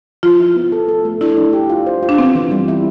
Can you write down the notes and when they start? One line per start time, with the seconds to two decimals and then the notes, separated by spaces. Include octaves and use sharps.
0.23 F3 F4
0.40 E4
0.56 B3
0.72 A4
0.89 A4
1.05 A3
1.21 D4 E4
1.37 D4
1.53 G4
1.70 F4
1.86 C5
2.03 F4
2.09 D4
2.18 B3 C4
2.35 E3
2.51 G3
2.68 E4